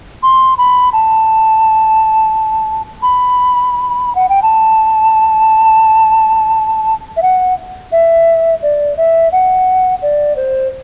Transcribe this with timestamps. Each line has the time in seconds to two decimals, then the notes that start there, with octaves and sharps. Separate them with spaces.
0.23 C6
0.58 B5
0.93 A5
3.02 B5
4.15 F#5
4.29 G5
4.42 A5
7.17 E5
7.22 F#5
7.92 E5
8.62 D5
8.97 E5
9.32 F#5
10.02 D5
10.36 C5